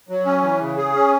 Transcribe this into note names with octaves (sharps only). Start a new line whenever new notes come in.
F#3
C#4
E3
C#3
G#4
C#4